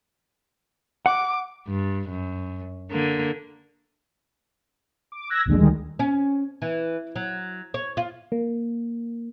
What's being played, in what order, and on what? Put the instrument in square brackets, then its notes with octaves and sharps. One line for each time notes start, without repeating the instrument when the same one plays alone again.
[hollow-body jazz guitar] F#5 [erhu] D6
[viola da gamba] G2
F#2
D3 A#3
[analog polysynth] D6
E6 F#6 G#6 A#6
A#1 D#2 D3 G#3
D2 D#3 G3 G#3
[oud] C#4
E3
F#3
C#5
F4
[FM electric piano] A#3